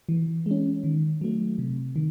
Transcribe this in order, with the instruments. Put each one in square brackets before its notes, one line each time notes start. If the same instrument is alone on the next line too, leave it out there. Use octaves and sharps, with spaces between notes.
[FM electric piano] E3
G#3 C#4
D#3
F#3 A3
C3
D#3